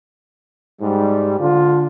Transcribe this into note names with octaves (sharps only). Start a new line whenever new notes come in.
G#2 G3
D3 F4